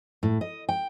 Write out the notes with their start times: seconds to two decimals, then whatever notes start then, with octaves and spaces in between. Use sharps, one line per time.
0.23 A2
0.41 D#5
0.69 G5